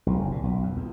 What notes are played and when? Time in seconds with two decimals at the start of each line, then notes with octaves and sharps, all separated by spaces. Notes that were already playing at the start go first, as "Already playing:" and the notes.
0.06 B1
0.19 F#1
0.32 A#2
0.44 B1
0.63 F2
0.77 E2